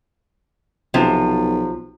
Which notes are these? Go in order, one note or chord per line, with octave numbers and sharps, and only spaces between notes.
B1 C3 F3